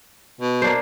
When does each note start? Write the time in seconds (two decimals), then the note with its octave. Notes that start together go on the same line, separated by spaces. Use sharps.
0.41 B2
0.62 A#3 D4 C5